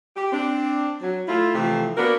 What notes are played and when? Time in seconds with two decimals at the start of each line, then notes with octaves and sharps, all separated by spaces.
0.16 G4
0.33 C4 D4
1.01 F#3
1.28 A3 E4 F4
1.55 C3 E3 F3 A3
1.97 A#3 B3 D4 F#4 A#4